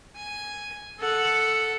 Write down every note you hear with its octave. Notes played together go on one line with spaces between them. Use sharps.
G#5
A4 F#5